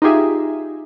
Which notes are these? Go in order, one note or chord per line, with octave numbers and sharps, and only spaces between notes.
D#4 F4 G4 G#4 E5